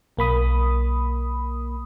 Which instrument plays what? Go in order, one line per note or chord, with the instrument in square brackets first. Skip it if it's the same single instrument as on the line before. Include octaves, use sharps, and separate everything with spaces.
[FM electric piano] B1 A#3 B5 D#6